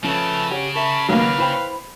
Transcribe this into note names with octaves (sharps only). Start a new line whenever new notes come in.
C#3 F3 A3 C#4 B4 A5
G4 C#5 F#5
A#4 E5 A5 B5 C#6
D#3 F#3 A#3 B4 F5
E4 C5 G5 B5